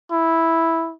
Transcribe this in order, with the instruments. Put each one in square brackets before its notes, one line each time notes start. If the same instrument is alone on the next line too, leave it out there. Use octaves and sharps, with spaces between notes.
[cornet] E4